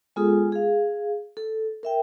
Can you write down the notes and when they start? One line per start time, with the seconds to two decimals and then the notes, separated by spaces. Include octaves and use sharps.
0.16 G#3 B3 F4 G#4 A4 D#6
0.52 G#4 F5
1.37 A4
1.83 A#4 E5 G5